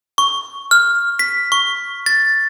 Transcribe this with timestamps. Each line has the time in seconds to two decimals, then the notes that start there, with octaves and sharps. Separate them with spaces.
0.18 C#6
0.71 F6
1.19 B6
1.52 C#6
2.06 A6